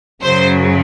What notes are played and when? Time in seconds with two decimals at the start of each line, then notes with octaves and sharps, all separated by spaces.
0.22 F#2 C#3 F#3 C5